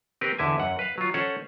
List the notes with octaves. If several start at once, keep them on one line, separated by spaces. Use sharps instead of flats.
C4 G4 A#4 B4
E2 D3 E4 E5 G#5
F#2 F#5
B4 F5
F#3 F4
C#4 A4 C5 C#5 F#5